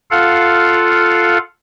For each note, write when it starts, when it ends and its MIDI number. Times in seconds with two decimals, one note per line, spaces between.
0.11 1.38 65
0.11 1.38 69
0.11 1.38 77
0.11 1.38 78